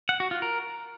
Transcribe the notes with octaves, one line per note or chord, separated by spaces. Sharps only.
F#5
F#4
F4
A#4